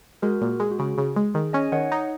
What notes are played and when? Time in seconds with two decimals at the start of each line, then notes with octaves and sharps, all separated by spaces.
0.22 G#3 F#4 A#4
0.42 A#2
0.60 G#3
0.71 F#4
0.79 C#3 G#4
0.98 C#3
1.16 G#3
1.34 D#3 G#4
1.53 C#4 D#5 G#5
1.72 D#3 C#5 F#5
1.92 D#4